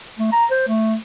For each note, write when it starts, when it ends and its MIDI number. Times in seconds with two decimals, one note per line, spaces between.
0.18 0.31 57
0.32 0.46 82
0.51 0.65 72
0.68 0.96 57